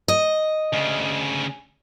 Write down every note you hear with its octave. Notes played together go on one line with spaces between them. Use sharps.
D#5
D2 C#3